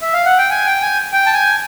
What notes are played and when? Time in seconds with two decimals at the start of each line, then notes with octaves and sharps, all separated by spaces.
0.01 E5
0.13 F5
0.25 F#5
0.38 G5
0.50 G#5
0.66 G5
0.81 G#5
1.12 G5
1.26 A5
1.34 G#5